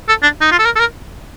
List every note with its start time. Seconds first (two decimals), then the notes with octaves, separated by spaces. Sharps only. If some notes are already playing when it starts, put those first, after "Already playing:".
0.08 A4
0.23 D4
0.41 D#4
0.52 F4
0.59 A4
0.65 A#4
0.75 A4
0.80 A#4